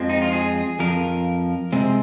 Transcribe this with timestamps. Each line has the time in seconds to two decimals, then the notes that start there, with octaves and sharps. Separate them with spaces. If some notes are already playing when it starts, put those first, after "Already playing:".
Already playing: F2 F3 G#3 C4
0.10 D#4
0.22 F4
0.33 G#4
0.79 F2 F3 A#4
1.72 C3 G#3 C4